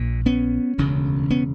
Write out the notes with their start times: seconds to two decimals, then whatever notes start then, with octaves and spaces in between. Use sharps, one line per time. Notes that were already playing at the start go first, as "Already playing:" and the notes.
Already playing: A#1 A#2
0.26 B3 C#4
0.78 E1 D2 C#3
1.30 B3 C#4